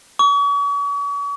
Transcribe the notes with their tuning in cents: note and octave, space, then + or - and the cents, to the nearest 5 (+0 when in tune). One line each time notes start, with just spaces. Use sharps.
C#6 +40